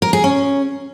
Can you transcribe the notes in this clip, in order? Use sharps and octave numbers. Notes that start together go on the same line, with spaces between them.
A#4
G#4
C#4